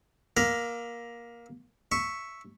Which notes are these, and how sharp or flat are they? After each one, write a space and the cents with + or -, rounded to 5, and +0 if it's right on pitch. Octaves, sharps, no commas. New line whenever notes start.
A#3 +15 A#4 +15 E5 +35
E5 +0 C#6 +0